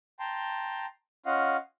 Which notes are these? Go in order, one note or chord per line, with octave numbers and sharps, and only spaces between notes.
G5 A5 A#5 C6
C#4 F4 D#5 F5 F#5